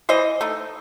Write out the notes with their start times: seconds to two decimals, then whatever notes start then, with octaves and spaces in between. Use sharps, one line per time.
0.09 E3 C5 D#5
0.41 A3 D#4